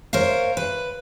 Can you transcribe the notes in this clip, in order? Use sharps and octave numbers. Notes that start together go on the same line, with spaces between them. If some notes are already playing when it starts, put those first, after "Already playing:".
A#4 C5 C#5 F5
B4